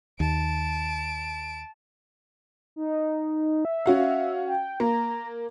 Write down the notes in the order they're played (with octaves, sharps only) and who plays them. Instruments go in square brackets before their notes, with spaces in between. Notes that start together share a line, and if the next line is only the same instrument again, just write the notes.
[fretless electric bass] D#2 [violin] A5 D7
[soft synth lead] D#4
E5
[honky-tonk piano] C#4 F#4 F5
[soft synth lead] G5
[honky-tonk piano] A#3 [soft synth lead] A#5